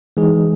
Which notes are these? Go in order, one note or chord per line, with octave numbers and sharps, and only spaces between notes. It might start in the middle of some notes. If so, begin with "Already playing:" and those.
E3 G#3 D#4 G#4